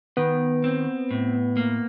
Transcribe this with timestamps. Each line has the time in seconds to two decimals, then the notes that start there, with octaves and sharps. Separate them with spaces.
0.17 D#3 B3
0.64 C4
1.11 A2
1.57 A#3